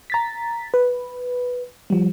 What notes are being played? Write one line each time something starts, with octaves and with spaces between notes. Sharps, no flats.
A#5 A6 B6
B4
F3 G3